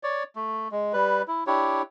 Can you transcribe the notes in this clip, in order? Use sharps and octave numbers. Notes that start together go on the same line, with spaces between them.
C#5 D5
A3
G#3
G3 B4
E4
D4 E4 G4 C#5